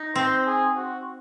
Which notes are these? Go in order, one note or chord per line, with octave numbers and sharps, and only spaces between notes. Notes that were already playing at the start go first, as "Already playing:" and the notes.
Already playing: D#4
C4 C5
G#4
F#4